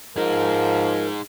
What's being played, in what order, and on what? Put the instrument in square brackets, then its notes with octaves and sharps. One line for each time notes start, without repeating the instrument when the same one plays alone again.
[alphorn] F3 [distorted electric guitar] D#4 G#4 [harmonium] A#4